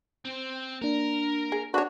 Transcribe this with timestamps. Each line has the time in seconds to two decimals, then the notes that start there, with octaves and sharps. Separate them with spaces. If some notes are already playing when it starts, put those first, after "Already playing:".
0.25 C4
0.82 A#3 D4 A#4
1.52 G#4
1.74 D4 F#4 B4 C#5